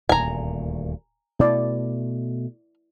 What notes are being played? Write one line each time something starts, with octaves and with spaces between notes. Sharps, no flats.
D#1 D2 A#2 G#5 A#5
B2 A3 E4 D5